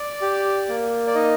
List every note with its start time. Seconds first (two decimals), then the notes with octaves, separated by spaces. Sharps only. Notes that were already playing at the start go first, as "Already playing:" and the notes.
Already playing: D5
0.22 G4
0.69 A#3
1.07 D5
1.15 D#4 D#5